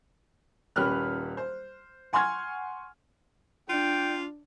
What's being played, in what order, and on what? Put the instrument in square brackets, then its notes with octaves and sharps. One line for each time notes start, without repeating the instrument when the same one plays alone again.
[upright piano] D#1 C#4 G4 B4 F6 F#6
C5
F#5 G#5 C6 C#6 F6 G#6
[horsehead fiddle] D4 [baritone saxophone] F4 [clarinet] G5